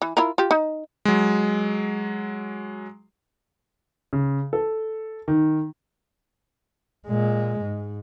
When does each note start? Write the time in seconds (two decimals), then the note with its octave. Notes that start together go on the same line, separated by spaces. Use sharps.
0.02 E3
0.17 E4 F4 A#4
0.38 F4 G4
0.51 D#4
1.05 F#3 G#3
4.13 C#3
4.53 A4
5.28 D#3
7.07 A#2 G#3
7.61 G#2